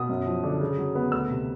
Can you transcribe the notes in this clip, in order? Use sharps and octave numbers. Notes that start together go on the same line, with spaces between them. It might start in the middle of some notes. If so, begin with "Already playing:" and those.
Already playing: B2 D#6
F#2
F3
D3
C#3
F#3
B3
D2 E6
C3